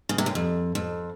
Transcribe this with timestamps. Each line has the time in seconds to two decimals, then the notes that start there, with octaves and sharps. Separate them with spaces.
0.09 C#3
0.18 C3
0.26 F#2
0.35 F2
0.75 F2